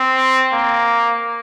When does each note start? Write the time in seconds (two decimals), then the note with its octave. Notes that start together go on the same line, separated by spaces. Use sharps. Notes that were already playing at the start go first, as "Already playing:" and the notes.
Already playing: C4
0.53 A#3